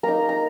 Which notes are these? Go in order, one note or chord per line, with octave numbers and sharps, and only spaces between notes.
A#3 D#4 A#5
A#5